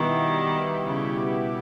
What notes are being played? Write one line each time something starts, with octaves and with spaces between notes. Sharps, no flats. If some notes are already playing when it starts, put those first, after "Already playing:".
Already playing: B2 D#3 G3 B3 E4 G4
C#3